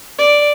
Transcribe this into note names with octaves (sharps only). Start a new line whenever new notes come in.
D5